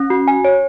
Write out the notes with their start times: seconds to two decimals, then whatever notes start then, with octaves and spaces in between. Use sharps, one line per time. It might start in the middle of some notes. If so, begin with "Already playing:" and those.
Already playing: C#4
0.10 F#4
0.28 G#5
0.45 C#5